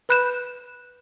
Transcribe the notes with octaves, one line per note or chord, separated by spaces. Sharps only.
B4 B5 F#6 G6 E7